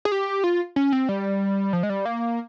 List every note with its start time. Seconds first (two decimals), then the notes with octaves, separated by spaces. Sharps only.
0.05 G#4
0.12 G4
0.44 F4
0.76 C#4
0.93 C4
1.09 G3
1.73 F3
1.83 G#3
1.90 G3
2.05 A#3